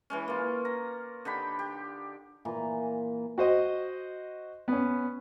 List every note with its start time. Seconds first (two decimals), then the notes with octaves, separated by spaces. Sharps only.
0.10 E3 G#3 C#4
0.28 A#3 F4
0.65 A#5
1.25 D3 D#4 G4 B5
1.59 G4
2.45 A#2 E3
3.38 F#4 C5 D#5
4.68 B3 C#4